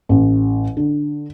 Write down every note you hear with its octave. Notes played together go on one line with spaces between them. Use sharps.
A1
D3